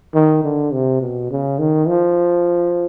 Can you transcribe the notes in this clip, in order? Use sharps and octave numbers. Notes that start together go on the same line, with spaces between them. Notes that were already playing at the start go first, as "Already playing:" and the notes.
D#3
D3
C3
B2
C#3
D#3
F3